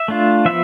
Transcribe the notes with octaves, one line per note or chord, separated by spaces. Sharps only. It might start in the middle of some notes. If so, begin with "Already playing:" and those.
Already playing: E5
A3 D4 F4
F3 B3 E5